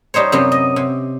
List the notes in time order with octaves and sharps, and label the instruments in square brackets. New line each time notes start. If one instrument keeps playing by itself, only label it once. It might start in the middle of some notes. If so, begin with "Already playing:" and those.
[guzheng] G3 D#4 C5 C#5
F#2 C3 F#3 B3
D#5
C3